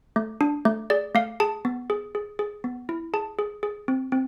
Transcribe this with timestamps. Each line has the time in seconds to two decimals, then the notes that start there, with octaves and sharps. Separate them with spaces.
0.16 A3
0.41 D4
0.65 A3
0.90 G#4 D5
1.15 A3 F5
1.40 G#4 A5
1.65 B3
1.90 G#4
2.15 G#4
2.39 G#4
2.64 B3
2.89 E4
3.14 G#4 A5
3.39 G#4
3.63 G#4
3.88 C4
4.12 C4